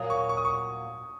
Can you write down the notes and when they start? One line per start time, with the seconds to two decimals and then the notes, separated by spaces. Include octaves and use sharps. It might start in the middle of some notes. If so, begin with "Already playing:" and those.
Already playing: A#2 F#3 A#3 F4 A#4 D#6
0.10 C#6
0.29 C#6
0.37 D#6
0.45 C#6